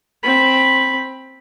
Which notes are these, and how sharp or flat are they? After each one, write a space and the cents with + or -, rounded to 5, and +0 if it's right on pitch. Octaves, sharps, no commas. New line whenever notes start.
C4 +10 B5 +0